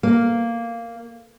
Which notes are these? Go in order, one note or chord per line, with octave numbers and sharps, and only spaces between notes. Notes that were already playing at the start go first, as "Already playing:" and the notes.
A#3